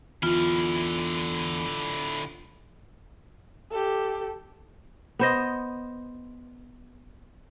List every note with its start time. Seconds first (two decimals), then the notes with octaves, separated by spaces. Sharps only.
0.23 E2 D3 E4 F4
3.71 G4 A4
5.19 B3 C5 D#5